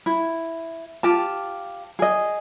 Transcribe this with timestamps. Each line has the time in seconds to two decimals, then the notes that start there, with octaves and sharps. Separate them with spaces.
0.06 E4
1.03 F4 G4 A5
1.99 G#4 D#5